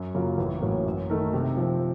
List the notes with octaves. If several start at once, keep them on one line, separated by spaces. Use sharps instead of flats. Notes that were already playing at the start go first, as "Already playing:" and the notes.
Already playing: F#2
C#3 F#3 A#3 F4
A1
A2 F#3 A#3 C#4
F#2
D#3 A3 D#4 A#4
C3
F3 C4